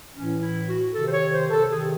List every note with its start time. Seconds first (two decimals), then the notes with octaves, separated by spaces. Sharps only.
0.14 A2 E3 C#4
0.40 E4
0.66 F#4
0.93 C3 D#3 A4
1.08 C5
1.11 C#5
1.31 C5
1.50 A4
1.70 C3 D#3 G#4